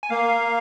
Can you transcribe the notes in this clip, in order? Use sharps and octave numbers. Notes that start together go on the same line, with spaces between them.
G#5
A#3 F5